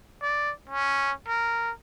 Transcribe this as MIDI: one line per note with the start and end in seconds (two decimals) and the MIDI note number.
0.22 0.52 74
0.70 1.12 61
1.28 1.71 70